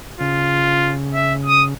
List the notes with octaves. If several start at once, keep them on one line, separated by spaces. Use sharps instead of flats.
C#3 F4
E5
D#6